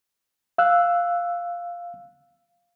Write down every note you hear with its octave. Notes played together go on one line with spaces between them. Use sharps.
F5 E6 F#6